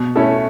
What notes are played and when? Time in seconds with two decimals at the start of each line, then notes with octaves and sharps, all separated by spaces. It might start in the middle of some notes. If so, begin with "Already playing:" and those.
Already playing: B2
0.16 A3 C#4 E4 A4